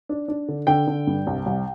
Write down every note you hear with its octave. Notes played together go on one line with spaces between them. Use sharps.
D4
D4
D3
D3 G5
D3
G2
C2
C2